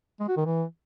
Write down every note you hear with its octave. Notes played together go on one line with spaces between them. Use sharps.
G#3
F#4
D#3
E3